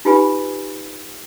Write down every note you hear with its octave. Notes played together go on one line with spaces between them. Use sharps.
D#4 F4 G4 B4 G#5 B5